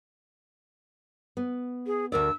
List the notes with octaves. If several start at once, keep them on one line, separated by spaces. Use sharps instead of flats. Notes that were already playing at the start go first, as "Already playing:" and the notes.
B3
G#4
D2 A#4 D5 E6